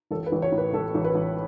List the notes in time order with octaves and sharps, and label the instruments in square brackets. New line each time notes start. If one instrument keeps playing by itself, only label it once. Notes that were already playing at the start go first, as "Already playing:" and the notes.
[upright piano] A1 A4
B4
A1
C#5
A2
B4
A1 A4
A1
B4
A1